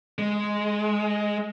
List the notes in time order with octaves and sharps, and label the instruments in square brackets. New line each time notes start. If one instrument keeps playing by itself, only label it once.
[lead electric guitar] G#3